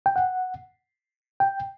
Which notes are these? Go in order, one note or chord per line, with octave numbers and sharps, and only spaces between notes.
G5
F#5
G5